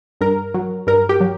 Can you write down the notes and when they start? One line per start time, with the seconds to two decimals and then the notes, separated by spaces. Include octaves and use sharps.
0.21 G2 A#4
0.54 F#3
0.87 G2 A#4
1.09 G4
1.21 F#3